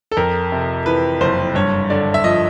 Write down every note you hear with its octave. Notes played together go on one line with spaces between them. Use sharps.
A4
F2 A#4
C3
E3 B4
F#1 C5
G2 C#5
D3 D5
E5
F3 D#5